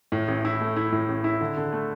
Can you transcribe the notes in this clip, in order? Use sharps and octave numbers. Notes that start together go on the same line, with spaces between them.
A2
A1
E4
A3
E4
A2
A1
E4
D3
D3
A3